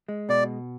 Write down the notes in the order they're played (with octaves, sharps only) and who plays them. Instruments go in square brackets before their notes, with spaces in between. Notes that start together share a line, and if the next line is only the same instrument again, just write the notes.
[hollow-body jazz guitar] G#3
[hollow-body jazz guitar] B2 [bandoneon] D5